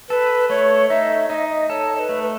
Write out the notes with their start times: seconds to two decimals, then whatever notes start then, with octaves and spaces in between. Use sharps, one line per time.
0.09 A4 B4
0.50 A3 C#5
0.89 D#4 E5
1.30 D#4 D#5 E5
1.70 A4 C#5
1.96 C#5
2.00 B4
2.09 A3
2.22 B4